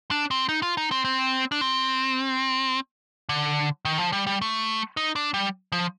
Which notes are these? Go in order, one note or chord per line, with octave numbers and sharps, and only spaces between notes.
D4
C4
D#4
F4
D#4
C4
C4
D4
C4
D3
D#3
F3
G3
G3
A3
D#4
D4
G3
F3